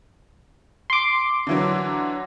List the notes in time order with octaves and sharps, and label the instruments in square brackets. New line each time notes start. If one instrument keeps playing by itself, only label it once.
[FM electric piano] C6 D6
[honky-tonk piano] D3 E3 F#3